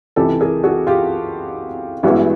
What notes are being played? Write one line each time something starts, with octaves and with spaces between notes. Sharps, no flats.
C#2 C3 E3 G4 A4
G#4 A#4
F#4 G#4
F4 G4
A1 G2 E3 G#3 B3 E4 F#4